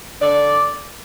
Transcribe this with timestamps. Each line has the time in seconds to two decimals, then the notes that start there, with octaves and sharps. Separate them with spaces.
0.22 D3 D5